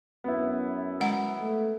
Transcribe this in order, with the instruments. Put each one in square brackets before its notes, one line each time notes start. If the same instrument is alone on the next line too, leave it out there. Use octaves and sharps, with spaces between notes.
[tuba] F#2 [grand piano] B3 E4
[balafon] G#3 F#5 A#5
[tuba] A3